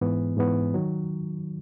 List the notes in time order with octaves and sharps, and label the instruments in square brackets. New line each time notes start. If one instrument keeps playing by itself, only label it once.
[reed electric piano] G#2 E3 B3
G#2 E3 B3
D#3 F#3